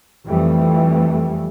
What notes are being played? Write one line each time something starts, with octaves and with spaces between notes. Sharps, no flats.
F2 E3 G3 A3